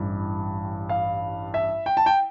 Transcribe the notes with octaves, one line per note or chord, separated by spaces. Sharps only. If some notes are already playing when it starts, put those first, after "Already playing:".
Already playing: A1 G2 E3
F5
E5
G5
A5
G5